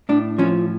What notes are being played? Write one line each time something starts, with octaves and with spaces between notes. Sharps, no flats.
A2 D4
F3 C#4